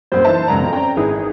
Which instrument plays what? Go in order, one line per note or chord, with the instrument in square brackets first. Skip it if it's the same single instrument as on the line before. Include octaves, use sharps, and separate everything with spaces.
[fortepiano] F#2 A#2 G3 [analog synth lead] C5
[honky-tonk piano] E3 A5 [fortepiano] D#4 B4 E5
[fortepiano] C#2 F#2 D5 [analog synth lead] A#5
[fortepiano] F2 B2
[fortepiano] C#4 D5 [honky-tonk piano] G5
[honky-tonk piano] G#1 [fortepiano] E4 B4 [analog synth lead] G#4